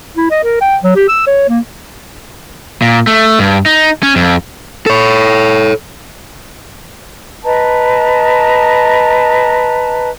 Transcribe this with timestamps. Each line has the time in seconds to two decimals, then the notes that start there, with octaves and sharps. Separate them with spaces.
0.17 E4
0.31 D#5
0.44 A#4
0.61 G5
0.83 F#3
0.96 G4
1.09 E6
1.27 C#5
1.49 A#3
2.82 A#2
3.07 A3
3.39 G2
3.66 D#4
4.03 C#4
4.16 F2
4.86 A4 C#5
7.44 B4 D#5 A5 A#5